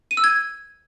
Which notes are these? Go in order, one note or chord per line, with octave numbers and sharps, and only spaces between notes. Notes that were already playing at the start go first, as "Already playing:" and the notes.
D#7
E6
G#6